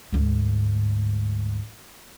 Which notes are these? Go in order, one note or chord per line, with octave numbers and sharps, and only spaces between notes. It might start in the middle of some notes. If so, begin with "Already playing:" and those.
D2 G#2